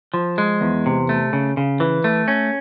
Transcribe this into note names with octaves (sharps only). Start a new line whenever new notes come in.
F3
G#3
E2
C3
A3
C#3
C#3
E3
A3
C#4